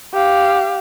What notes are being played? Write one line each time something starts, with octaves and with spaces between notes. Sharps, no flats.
G4 F5